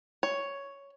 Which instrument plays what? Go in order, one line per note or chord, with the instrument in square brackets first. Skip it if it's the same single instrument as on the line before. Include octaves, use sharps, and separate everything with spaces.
[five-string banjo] C#5